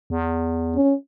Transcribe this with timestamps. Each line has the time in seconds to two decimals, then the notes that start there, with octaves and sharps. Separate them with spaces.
0.10 E2
0.75 C#4